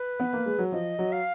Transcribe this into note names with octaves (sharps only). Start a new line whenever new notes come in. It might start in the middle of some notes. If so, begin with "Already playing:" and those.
Already playing: B4
B3
A#3
G#3
F#3
F3 D#5
F#3
F5